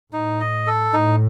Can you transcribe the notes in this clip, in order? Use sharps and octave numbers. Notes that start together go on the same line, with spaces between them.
A2 D#4
D#5
A4
A2 D#4